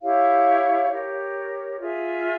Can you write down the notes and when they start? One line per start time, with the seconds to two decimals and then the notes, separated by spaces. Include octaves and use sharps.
0.02 E4 G4 C#5 F5
0.91 G4 A#4 C#5
1.80 F4 G#4 E5